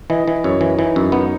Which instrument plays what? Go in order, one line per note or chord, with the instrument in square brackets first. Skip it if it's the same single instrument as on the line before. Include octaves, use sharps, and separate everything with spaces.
[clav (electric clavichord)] E3 [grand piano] D#5
[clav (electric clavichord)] E3
[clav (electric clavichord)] F#2 [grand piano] C#5
[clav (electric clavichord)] E3
[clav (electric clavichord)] E3 [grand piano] D#4
[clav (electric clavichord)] F#2 [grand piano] C#4
[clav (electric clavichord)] B3 [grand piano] D#4